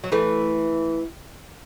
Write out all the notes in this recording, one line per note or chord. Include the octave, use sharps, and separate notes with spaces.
F#3
E3 A3